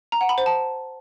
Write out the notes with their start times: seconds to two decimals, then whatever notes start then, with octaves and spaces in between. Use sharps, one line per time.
0.12 A#5
0.21 F#5
0.29 B5
0.38 C5
0.46 A5